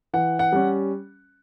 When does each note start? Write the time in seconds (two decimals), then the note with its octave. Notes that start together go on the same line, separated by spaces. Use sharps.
0.13 E3 F#5
0.39 F#5
0.52 G3 C#4